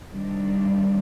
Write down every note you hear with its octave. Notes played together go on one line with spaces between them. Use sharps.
C3 D#3 G3 D4